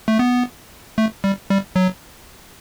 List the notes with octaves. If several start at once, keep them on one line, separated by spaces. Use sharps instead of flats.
A3
B3
A3
G3
G3
F#3